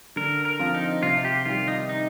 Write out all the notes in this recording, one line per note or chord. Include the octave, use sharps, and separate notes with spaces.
D3 A#4
A#4
F3 C4 F4
D#4
C3 F4
G4
D#3 G3 F4
D#4
D#4